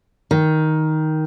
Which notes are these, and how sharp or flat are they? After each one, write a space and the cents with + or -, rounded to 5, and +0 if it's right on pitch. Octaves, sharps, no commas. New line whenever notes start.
D#3 +5